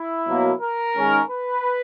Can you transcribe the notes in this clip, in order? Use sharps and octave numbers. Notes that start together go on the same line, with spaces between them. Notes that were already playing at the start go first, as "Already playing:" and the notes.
Already playing: E4
B2 F#3 A#3
A#4
D#3 G#3 C#4
B4